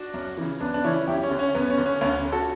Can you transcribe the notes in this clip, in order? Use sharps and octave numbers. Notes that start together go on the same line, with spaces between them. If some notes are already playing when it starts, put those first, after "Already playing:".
Already playing: D4 F#4
F#2
C#3 E3
F#2 B3 D4
D4
C#3 E3 C#4 E4
F#2 E4 G4
C#4
D3
C#4
F#2 B3
C#4
D3
C#4
D2 C#4
C#4
D3
F#4 A4